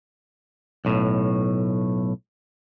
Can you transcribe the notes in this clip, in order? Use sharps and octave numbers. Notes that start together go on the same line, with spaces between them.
B1 A2